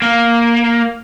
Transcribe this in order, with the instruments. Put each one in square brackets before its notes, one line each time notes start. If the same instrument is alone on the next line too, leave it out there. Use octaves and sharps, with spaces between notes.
[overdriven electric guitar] A#3